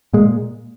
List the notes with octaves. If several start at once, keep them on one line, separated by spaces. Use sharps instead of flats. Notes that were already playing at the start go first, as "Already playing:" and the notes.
A#2 G#3